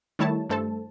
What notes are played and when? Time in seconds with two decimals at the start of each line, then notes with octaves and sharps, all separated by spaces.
0.19 D#3 G3 A3 E4 C#5 A5
0.49 G2 A3 A4 C5 A5